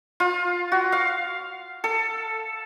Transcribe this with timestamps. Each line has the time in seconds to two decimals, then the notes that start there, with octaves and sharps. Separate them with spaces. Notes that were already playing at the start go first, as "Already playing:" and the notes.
0.20 F4
0.72 F#4
0.92 F5
1.84 A4